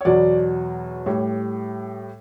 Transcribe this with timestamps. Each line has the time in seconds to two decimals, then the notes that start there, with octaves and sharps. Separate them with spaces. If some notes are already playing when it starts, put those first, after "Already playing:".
0.01 C#5
0.05 E2 B2 F#3 D5
1.06 A2 G3 C#5